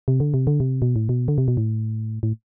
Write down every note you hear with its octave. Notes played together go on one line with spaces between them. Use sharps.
C3
D3
C3
D3
C3
B2
A2
B2
D3
C3
B2
A2
A2